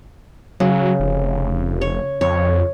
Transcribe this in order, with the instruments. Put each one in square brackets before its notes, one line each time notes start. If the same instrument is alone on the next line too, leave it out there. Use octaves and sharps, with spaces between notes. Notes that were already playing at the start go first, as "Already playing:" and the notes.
[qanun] C#3 [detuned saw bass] F#3
[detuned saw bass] F1
[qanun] C#5
[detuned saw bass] F2 [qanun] C#5